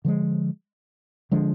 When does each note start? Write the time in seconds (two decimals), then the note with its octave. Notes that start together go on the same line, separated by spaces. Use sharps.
0.05 D3 F3 G#3
1.31 D3 F3 G#3 D4